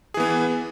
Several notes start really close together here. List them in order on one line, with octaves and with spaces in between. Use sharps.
G#4 E3 B3